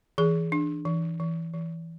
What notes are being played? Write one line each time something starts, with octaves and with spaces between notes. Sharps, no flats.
E3 G#4
D4
E3
E3
E3